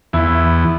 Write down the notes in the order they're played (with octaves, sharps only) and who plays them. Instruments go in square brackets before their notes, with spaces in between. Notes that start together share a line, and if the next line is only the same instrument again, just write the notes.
[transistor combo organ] E2 [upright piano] E4